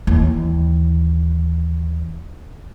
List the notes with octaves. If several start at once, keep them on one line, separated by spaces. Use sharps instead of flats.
D#2 E3